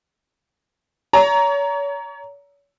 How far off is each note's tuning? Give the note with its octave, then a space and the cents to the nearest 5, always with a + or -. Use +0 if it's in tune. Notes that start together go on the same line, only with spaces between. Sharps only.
C#5 +35 A#5 +0